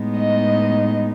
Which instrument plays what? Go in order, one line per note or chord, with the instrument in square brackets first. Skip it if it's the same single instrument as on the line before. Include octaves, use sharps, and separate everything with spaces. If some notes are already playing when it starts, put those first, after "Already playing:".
Already playing: [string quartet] A2 G#3 B3 D#4
D#5